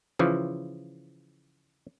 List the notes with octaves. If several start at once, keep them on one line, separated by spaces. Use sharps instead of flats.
C#3 E3 F3